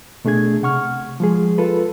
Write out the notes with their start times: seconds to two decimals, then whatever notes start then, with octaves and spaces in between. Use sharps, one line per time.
0.25 B2 A3 D4 G#4 G#6
0.62 C3 F#5 C#6 F6
1.20 F3 G#3 G#4
1.58 F4 A4 B4